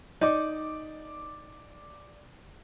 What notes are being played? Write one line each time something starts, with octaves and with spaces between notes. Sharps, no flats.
D#4 D5 D6